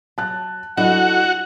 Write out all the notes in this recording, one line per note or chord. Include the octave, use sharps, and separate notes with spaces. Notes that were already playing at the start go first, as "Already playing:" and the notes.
F#3 A5 F#6
F#3 D4 E4 F#4 A4 D#5 F#5